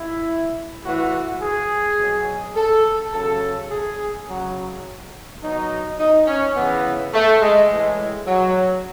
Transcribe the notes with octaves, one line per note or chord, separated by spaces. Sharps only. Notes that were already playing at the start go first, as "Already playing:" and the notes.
Already playing: E4
A2 E3 F#4
G#4
B2 F#3
A4
C#3 F#3 A4
G#4
C#3 F#3
B2 F#3 D#4
D#4
C#4
C#3 E3 B3
A3
G#3
A2 E3 G#3
F#3